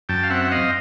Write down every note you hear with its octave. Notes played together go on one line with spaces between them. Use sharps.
F#2 G5 A5
F5
C4 E5 F#5
F#5
C4 D#5 F5